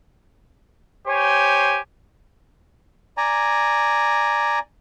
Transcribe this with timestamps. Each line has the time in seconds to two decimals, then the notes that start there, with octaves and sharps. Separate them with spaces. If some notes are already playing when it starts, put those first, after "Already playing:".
1.08 G4 C5 C#5 G#5
3.17 D5 G#5 A#5